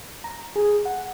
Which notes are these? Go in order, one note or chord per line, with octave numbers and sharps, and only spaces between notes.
A#5
G#4
F#5